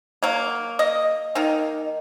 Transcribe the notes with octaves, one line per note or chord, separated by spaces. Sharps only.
F#3 A#3
D#5
D#3 A#3 D#4